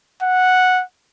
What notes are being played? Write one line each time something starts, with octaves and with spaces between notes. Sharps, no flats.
F#5